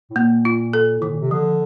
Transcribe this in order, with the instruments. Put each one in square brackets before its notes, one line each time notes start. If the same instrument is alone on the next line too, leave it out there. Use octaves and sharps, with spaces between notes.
[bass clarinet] A2
[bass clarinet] A#2 [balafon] A#3
[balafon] F4
A4
[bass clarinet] A2 [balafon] D#3
[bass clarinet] A#2
C3
[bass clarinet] D3 [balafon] F3